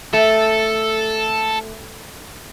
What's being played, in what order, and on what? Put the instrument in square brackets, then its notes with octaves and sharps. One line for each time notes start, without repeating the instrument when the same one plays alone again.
[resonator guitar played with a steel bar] A3 [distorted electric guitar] A4